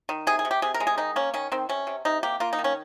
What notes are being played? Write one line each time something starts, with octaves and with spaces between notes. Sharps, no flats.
D#3
C3 G#4
G#4
C3
G4
C3 G#4
A#4
G#3
G#4
D#3 D#4
A#3 C#4
D#3 C#4
D#3 C4
C3 C#4
C3
C3 D#4
A#3 G4
A#3 F4
D#4
D#3
C#4